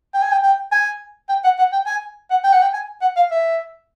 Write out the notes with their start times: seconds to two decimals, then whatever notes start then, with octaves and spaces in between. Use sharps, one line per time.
0.14 G5
0.23 G#5
0.32 G5
0.43 G5
0.72 G#5
1.29 G5
1.44 F#5
1.59 F#5
1.73 G5
1.87 G#5
2.31 F#5
2.44 G5
2.53 F#5
2.62 G5
2.74 G#5
3.02 F#5
3.17 F5
3.31 E5